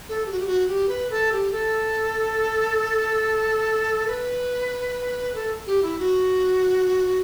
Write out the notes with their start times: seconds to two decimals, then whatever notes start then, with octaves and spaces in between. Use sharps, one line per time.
0.09 A4
0.26 G4
0.32 F#4
0.39 G4
0.46 F#4
0.68 G4
0.88 B4
1.10 A4
1.32 G4
1.52 A4
4.07 B4
5.35 A4
5.67 G4
5.82 E4
5.99 F#4